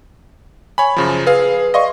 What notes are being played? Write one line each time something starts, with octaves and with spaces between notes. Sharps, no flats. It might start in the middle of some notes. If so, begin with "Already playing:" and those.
C#5 G#5 B5
F#2 C#3 F3
G#4 B4 F5
D5 D#5 F5 C6 C#6